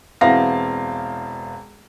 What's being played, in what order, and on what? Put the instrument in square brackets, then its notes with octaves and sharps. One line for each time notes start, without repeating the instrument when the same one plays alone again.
[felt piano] E1 B3 C4 E4 F5 A#6